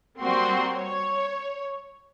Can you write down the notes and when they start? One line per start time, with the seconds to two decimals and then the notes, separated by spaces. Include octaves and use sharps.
0.21 G3 A#3 C4 F#4 C6
0.75 C#5